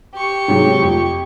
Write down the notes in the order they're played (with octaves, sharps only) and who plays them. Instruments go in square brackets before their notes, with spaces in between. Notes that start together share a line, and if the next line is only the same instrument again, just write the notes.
[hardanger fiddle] G4 C#6
[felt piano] G#2 C3 F#3
F2 F3